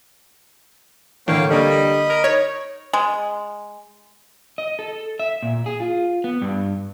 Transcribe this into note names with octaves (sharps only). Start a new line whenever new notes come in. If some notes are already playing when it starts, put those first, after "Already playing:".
A2 D3 E3 A#3 C#5 F5 G5
G3 A#3 D4 A4 D#5 B5
A#4
D#4 C#5
G#3
D#5
A4
E5
A#2
G#4
F4
B3
G2